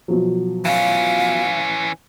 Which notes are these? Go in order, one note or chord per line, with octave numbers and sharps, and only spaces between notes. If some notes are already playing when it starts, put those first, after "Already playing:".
B2 F3 F#3
E3 C#4 F5